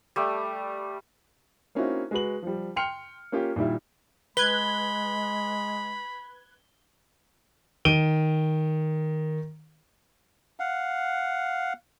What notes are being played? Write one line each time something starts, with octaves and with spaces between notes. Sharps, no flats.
G3 A3
A#3 C4 C#4 D#4 E4 F#4
G#3 F#4 B4 F#7
F3 G3
G5 C6 F6 C#7 F7
A#3 C#4 F4 G4
A#2 D#3 G3 E4
G#3 B4 B5 F#6 G#6 G7
D#3 D7 D#7 G7
F5 F#5